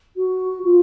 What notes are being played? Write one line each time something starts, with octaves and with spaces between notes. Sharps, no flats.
F#4
F4